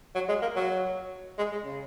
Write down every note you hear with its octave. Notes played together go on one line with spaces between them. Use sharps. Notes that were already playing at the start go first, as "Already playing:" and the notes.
F#3
G#3
A#3
F#3
G#3
G#3
C#3